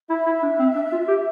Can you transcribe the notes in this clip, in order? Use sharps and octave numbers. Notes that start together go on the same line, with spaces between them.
E4 E5
E4
D4
C4
D4
F4
G4